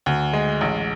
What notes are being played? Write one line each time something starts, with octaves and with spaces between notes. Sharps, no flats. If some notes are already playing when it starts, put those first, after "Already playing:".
D2
G#3
A1